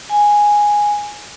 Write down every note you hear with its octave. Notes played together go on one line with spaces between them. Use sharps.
G#5